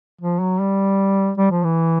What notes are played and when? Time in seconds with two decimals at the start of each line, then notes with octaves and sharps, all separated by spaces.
0.21 F3
0.41 F#3
0.60 G3
1.38 G3
1.51 F3
1.64 E3